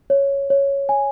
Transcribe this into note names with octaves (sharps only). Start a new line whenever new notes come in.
C#5
C#5
G#5